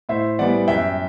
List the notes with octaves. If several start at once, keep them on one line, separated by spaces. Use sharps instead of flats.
A2 C5 E5
E3 G3 B3 D5 F#5
F#2 E5 G5